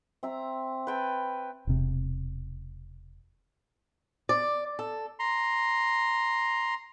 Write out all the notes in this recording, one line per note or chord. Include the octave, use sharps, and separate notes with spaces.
C4 E5 A#5
B4 G5 A5
E1 C3
D5
A4
A#5 C6